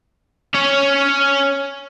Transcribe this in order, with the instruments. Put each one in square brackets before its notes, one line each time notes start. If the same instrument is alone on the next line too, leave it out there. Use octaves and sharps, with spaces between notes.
[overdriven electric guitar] C#4 C#5